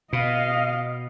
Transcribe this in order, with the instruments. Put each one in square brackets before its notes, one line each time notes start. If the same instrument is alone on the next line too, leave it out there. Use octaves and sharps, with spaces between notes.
[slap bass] B2 [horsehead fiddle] D#5 F5